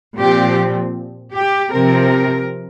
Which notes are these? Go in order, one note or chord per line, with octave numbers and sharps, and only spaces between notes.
A#2 F3 C4 G4
G4
C3 F3 C4 A#4